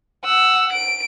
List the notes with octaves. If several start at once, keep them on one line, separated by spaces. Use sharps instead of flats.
F#5 E6
D7